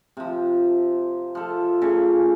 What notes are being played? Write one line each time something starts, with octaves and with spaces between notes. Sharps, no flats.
C3 F3
F3 A4
A#2 C#3 A3 C#4